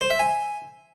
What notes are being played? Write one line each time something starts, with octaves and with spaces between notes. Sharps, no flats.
C5
E5
G#5